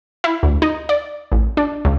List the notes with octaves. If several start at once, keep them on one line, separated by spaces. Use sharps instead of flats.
E4
D2
D#4
D5
A1
D4
C#2